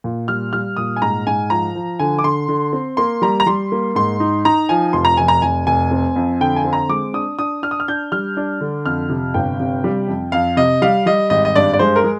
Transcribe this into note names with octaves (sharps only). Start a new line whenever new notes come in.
A#2
G3 F6
G3 F6
A#2 D#6
G#5
G#2 A#5
G#2 G#5
F3 A#5
F3
D3 G#5
D6
D3 C6
D3
C4
A#3 C6
G3 A#5
A#5
G3 C6
A#3
G#2 C6
D#4
D#4 A#5
F3 G#5
F1 C6
A#5
F1 G#5
A#5
F1 G#5
F1 G#5
C4
F2
D3 G5
G#5
C4
A#5
G#3 D6
D4 D#6
D4 D#6
D4 F6
D#6
F6
D4 G6
G3 F6
D4
D3
F2 F6
C3
G1 G5
C3
G3
F2
F2 F5
C3 D#5
G3 F5
G3 D#5
G#1 D#5
D#5
G2 D5
D5
G#3 C5
A#4
G#3